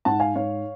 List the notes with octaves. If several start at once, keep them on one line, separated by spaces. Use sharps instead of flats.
G#2 F#5 A5
F5 G#5
G#2 C#5 F5